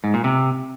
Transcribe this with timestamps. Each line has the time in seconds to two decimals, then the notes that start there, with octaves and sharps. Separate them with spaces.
0.04 G#2
0.14 A#2
0.24 C3